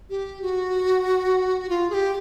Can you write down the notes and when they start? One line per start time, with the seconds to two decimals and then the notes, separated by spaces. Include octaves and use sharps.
0.10 G4
0.42 F#4
1.69 F4
1.90 G#4
1.94 G4